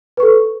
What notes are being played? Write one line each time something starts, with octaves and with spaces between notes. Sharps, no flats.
A4 B4 C#6